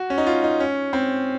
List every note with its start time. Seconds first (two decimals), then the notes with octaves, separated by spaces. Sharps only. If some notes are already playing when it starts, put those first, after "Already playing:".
Already playing: F#4
0.10 C#4
0.18 D#4
0.27 F4
0.44 D#4
0.60 C#4
0.93 C4